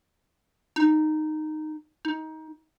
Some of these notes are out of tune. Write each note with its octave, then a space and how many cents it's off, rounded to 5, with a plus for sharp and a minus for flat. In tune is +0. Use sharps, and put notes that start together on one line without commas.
D#4 -10
D#4 +20